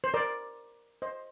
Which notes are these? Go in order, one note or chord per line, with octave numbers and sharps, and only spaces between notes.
C5
A#4 D5
C5 D#5